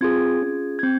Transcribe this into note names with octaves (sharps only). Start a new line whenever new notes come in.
C4 F4 G#4 G#6
C#4 F4 G#4
G#6
C4 G6